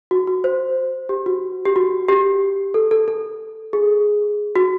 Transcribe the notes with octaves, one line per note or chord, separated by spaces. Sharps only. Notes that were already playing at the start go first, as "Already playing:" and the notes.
F#4
F#4
C5
G4
F#4
G4
F#4
G4
A4
A4
A4
G#4
F#4